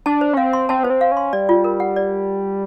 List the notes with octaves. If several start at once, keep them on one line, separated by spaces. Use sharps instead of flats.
D4 A5
C5
C#4
C4 F5
C6
C4 A5
B3 C5
C4
F5
C#4
C6
G3 D5
F4
A#4
F#5
D5